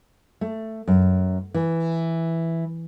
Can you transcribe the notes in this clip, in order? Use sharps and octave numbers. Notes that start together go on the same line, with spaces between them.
A3
F#2
E3